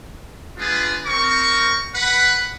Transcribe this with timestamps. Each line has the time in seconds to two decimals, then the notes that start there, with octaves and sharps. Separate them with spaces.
0.58 G#3 B3 D4 F4 G#4 B4
1.05 C4 A#4 C#6
1.95 B4 F#5 B5